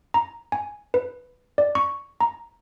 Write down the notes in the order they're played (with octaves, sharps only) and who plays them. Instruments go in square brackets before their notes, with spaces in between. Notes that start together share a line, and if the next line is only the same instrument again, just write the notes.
[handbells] A#5
G#5
B4
D5
C#6
A#5